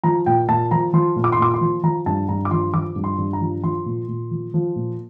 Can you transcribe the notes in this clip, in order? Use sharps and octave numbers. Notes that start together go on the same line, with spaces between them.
F3 A#5
A#2 G5
A#2 A5
F3 A#5
F3 C6
A#2
D6
C6
A#2 D6
C6
F3
F3 A#5
G2 A5
G2 A#5
D6
F3 C6
F3 D6
G2
C6
G2
A#5
F3
F3 C6
A#2
A#2
F3
F3
A#2